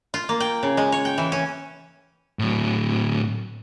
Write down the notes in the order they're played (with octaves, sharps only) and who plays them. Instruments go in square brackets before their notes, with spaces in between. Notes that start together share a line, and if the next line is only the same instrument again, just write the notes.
[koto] F4
A#3
G5
C#3
G#3
C#5
G5
E3
C#4
[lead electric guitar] A2 F#3